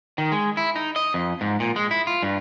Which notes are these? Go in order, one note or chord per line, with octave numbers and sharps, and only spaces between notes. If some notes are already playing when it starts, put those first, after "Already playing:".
D#3
G#3
E4
D#4
D#5
F2
G#2
A#2
G#3
E4
F4
G2